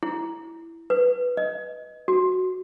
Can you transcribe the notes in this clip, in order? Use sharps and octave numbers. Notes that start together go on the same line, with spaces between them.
E4
B4
D#5
F#4